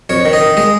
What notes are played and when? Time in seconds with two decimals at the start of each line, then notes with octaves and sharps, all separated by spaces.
0.09 F2 C#5
0.25 D#3
0.33 D#5
0.41 D#3
0.57 G#3 D#5